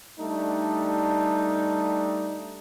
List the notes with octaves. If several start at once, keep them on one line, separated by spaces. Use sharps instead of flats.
G3 A3 D4 D#4